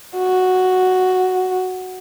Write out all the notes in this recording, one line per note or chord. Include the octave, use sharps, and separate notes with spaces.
F#4